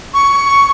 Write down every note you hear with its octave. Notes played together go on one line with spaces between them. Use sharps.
C#6